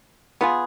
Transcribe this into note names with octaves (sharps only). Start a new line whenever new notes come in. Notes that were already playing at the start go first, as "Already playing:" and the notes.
B3 F4 G#4 B4